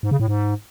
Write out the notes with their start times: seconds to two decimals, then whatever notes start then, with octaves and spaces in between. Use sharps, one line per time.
0.03 G#2
0.11 C#3
0.20 A2
0.28 G#2